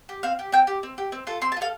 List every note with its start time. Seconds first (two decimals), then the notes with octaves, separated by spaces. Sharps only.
0.09 G4
0.23 C4 F5
0.39 G4
0.52 C4 G5
0.67 G4
0.83 C4
0.98 G4
1.12 C4
1.27 F4 A4
1.42 C4 C6
1.52 A5
1.57 F4
1.61 A4 F5